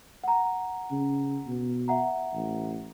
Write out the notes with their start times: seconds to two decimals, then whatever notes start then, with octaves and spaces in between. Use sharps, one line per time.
0.24 F#5 A#5
0.91 C#3
1.47 B2
1.88 E5 F#5 A#5
2.34 A1